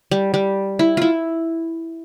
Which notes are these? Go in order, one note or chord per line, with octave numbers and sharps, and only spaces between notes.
G3
G3
E4
E4 F4